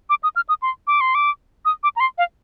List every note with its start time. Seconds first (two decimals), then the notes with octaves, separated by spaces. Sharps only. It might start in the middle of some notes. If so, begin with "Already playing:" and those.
0.10 D6
0.23 D#6
0.36 F6
0.49 D#6
0.62 C6
0.87 D6
1.01 C6
1.15 D6
1.65 D#6
1.83 D6
1.96 A#5
2.00 C6
2.18 F5